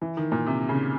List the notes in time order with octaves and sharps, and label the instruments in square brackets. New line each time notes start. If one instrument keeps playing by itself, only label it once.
[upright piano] E3
D#3
A#2
C3
C#3